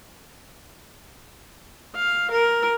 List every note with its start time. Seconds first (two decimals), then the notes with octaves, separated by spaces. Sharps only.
1.95 F5
2.31 A#4